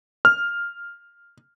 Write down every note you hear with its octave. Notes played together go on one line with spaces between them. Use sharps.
F6